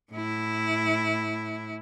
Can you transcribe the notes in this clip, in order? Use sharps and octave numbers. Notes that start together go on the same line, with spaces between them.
A2 E4